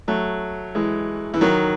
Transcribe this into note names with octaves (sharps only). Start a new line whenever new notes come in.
F#3 A3
E3 G#3
E3
D#3 F#3